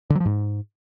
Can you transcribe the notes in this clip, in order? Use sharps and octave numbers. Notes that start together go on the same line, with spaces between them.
D3
F#3
F3
G#2